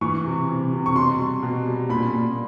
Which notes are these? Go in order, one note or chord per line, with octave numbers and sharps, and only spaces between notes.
E3 C#6
C3
C3
C3
C#6
B2 C6
G3
B2
G3
A#2 B5
A#2